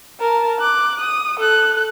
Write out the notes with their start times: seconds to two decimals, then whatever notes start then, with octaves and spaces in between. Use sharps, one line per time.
0.21 A#4 A5
0.59 D6 F#6
1.00 D#6
1.40 A4 F#6